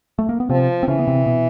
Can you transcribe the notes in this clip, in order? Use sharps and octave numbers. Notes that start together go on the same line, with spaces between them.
A3
A#3
B3
C3 F3 C4
C4
C#3 E3 C#4
B3
C3 C4
B2 B3